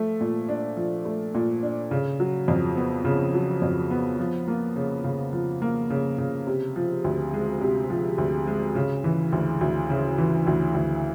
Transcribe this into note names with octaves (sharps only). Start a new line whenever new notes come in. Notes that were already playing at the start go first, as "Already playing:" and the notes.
Already playing: F3 A3
A#2
D4
F3
A3
A#2
D4
C#3
F#3
F2
B3
C#3
F#3
F2
B3
F3
A#3
C#3
C#3
F3
A#3
C#3
C#3
C3
F3
D2
G#3
C3
F3
D2
G#3
C#3
E3
D2
D2
C#3
E3
D2
D2